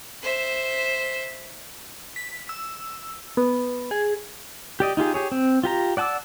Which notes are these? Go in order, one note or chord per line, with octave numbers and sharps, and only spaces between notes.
C5 E5
B6
E6
B3
G#4
G4 D5 D#5
D#4 F4 G4 G#4
G4 G#4 C#5
C4
F4 G4 A#5
D5 F#5 A5 D6 E6